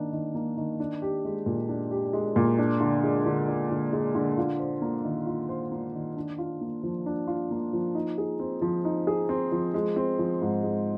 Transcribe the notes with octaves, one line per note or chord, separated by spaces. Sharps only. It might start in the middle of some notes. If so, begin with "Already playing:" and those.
Already playing: D#3 A#3 D4
D#3
A#3
D#3
D4
G4
G#3
A#2
D4
G4
G#3
A#2
D4
D3
G#3
D3
D4
D3
G#3
D3
F4
C5
A#3
D#3
F4
C5
A#3
D#3
D4
F4
A#3
F3
D4
F4
A#3
F3
D#4
G#4
C4
F3
D#4
G#4
C4
F3
G#3
C4
F3
G#2
G#3